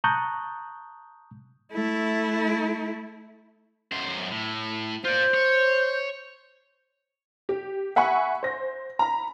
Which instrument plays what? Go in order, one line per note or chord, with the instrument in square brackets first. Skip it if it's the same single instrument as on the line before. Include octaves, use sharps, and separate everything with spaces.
[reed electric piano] A5 A#5 C#6 D#6 F#6 G6
[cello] A3 E4
[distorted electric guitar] F#2 C5
A2
[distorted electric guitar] F4 D5 [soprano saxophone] C5
[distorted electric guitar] C#5
[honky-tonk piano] G4
E5 F#5 G#5 B5 C#6
C5 A#6
A#5 B5